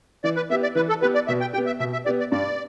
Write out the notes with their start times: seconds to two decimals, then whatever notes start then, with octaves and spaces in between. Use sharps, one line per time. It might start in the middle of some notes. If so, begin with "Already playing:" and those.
0.24 E3 D5
0.36 B4
0.50 B3 G4 E5
0.63 D5
0.75 E3 B4
0.89 A4
1.02 B3 G4 B4
1.15 D5
1.28 B2 E5
1.41 G5
1.53 G4 G5
1.58 B3
1.66 E5
1.79 B2 E5
1.93 E5
2.05 B3 G4 D5
2.20 D5
2.32 G2 D5